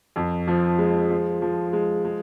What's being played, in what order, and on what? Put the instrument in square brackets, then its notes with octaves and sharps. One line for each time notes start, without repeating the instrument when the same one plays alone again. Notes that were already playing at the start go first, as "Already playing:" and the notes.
[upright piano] F2
F3
G#3
F3
F3
G#3
G#3